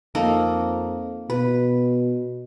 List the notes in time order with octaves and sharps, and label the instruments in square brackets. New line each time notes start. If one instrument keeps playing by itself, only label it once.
[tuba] F2 [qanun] A#3 D#4 A4
[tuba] B2 [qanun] B4